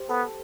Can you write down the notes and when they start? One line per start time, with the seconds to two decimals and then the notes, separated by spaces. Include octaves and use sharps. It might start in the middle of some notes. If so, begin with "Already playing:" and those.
Already playing: G4 C5
0.09 B3 A4